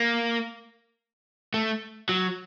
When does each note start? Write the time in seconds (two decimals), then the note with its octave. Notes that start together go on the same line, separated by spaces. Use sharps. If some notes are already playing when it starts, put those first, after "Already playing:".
Already playing: A#3
1.54 A3
2.09 F#3